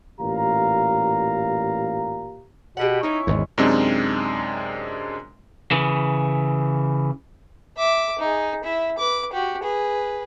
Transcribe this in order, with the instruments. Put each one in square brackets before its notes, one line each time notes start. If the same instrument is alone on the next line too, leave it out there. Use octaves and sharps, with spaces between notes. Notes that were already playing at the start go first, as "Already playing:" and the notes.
[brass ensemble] A1 A#2 G4 F5 A#5
[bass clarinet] B2 [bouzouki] G4 G#4 F#5
[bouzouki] C#4 E4 C#5 [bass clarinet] D#4
[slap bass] G#1 E2 [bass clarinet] G#3
[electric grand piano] F#2 C3 G#3 C4 D4 D#4
[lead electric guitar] C#3 E3
[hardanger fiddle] E5 D6
D#4 G#4
E4 E5
B4 D6
F#4 G4
G#4 B4